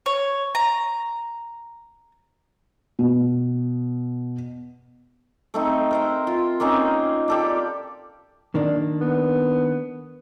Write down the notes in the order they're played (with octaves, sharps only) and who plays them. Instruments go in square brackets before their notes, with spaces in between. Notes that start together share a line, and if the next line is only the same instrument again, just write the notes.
[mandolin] C#5
A#5
[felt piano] B2
[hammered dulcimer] A3 C4 D#4
A#4 C5 E5
F4
A#3 C4 C#4 D#4
G4 A4 D5
[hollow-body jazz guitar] D#3 A#3 D4
[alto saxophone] B3